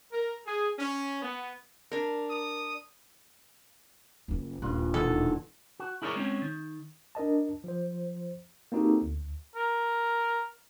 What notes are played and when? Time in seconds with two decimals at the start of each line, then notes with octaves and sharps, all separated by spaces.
0.11 A#4
0.47 G#4
0.78 C#4
1.22 B3
1.91 D4 A#4
2.30 D#6
4.28 F#1 F4
4.62 D#1 G2 F4 F#6
4.94 E2 B2 D#3 A4
5.80 F#4
6.02 E4 G#4 A#4 B4 C#5 D5
6.16 G#3 C4 C#4 C#5
6.42 D#3
7.15 D4 A#4 D#5 A5
7.64 F3 C5
8.72 A#3 C4 D#4 F#4 G4 A4
9.02 D2
9.55 A#4